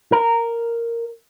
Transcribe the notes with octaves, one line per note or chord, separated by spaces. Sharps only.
A#4